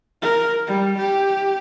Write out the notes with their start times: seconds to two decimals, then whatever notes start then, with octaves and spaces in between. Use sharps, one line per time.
0.22 A#4
0.67 G3
0.97 G4